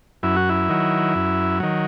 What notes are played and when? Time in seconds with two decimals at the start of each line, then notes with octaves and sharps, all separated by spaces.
0.23 F#2 E4
0.36 F#4
0.49 E4
0.69 D#3 F#3
1.15 F#2
1.60 D#3 F#3